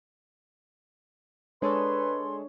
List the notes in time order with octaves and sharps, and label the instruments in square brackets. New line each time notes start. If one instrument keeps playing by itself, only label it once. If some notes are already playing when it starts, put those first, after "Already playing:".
[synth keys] G#3 G#4 A4 [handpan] D4 C#5 [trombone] B4 [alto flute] C6